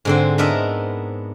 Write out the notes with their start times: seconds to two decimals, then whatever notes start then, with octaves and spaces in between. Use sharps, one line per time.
0.05 G#2 D3 C4
0.38 B3 D4 E4 A#4 D#5 E5